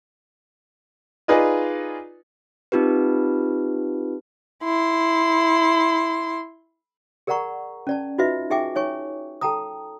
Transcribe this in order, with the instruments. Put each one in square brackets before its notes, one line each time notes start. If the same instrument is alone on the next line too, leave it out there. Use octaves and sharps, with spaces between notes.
[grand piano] D#4 F4 G#4 B4 D5 D#5
[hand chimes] C4 D#4 F4 G4 B4
[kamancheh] E4 C6
[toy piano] G#4 A#4 D5 F#5 A#5 C#6
C#4 D5 A5
D#4 F4 F#4 B4 D#5 E5
D#4 G#4 E5 G5 G#5 D6
D#4 C#5 G#5 C#6
A4 G5 A5 A#5 D#6